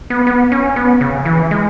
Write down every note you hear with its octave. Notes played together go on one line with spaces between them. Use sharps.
B3
B3
C#4
B3
C#3
E3
G#3